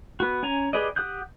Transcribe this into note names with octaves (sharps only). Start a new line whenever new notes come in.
B3 F#4
C#4 G#5 A#5
G4 G#4 B4 D5 D#5
G4 F#5 D#6 F#6 G6